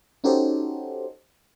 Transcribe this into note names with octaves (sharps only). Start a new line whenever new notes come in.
C#4 D#4 F#4 G4 A4 C5